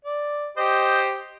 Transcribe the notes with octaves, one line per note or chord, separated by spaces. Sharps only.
D5
G4 C5 D#5